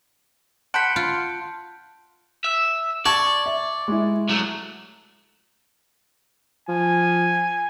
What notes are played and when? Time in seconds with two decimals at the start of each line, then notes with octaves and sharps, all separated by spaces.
0.74 F#5 A5 B5 C6 F#6 G6 C#7 D7
0.96 F4
2.44 E5
3.06 D5 A5 C#6 G#6 A6
3.46 E5
3.88 G#3 E4
4.29 F#3 A3
6.69 F3 G#5